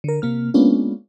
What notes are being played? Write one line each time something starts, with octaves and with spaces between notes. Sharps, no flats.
D3 A#4
C3 A#3 F6
G#3 A#3 B3 C#4 D4 F4